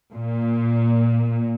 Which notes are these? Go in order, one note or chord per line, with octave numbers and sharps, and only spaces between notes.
A#2